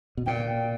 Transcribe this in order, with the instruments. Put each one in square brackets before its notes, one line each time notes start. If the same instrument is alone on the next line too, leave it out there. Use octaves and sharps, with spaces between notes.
[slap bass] B2
[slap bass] A#2 [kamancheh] G5